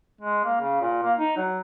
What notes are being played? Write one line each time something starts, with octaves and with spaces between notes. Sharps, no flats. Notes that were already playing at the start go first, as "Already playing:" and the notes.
G#3
A#3
C#3
A#2
A#3
D#4
F#3